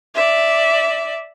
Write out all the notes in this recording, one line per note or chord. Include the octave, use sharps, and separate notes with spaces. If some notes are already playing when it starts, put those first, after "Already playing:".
D5 E5